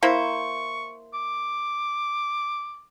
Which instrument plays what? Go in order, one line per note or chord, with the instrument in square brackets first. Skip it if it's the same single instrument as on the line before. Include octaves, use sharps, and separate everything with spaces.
[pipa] A#3 E4 C5 [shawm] C#6
[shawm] D6